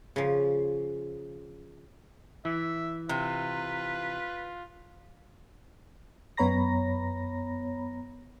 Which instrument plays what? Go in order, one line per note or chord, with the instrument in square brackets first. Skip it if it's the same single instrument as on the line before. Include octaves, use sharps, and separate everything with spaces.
[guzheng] C#3 F3
[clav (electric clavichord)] E3 [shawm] E5
[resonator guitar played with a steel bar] C3 [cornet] F4 [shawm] B4
[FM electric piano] F#2 B3 C#5 A#5 B5 A#6